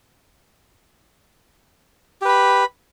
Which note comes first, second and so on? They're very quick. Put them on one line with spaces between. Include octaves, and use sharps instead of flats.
G4 B4 B5